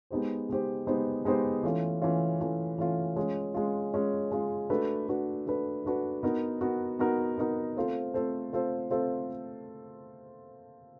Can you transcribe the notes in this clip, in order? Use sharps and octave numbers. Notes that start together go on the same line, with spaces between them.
G#3 B3 D#4 G4 C5
G#3 B3 D#4 G4 C5
G#3 B3 D#4 G4 C5
G#3 B3 D#4 G4 C5
E3 A3 C#4 F4
E3 A3 C#4 F4
E3 A3 C#4 F4
E3 A3 C#4 F4
G#3 C#4 F4
G#3 C#4 F4
G#3 C#4 F4
G#3 C#4 F4
A3 D4 F#4 B4
A3 D4 F#4 B4
A3 D4 F#4 B4
A3 D4 F#4 B4
B3 D#4 F#4 A#4
B3 D#4 F#4 A#4
B3 D#4 F#4 A#4
B3 D#4 F#4 A#4
A3 C4 F4 A4 C5
A3 C4 F4 A4 C5
A3 C4 F4 A4 C5
A3 C4 F4 A4 C5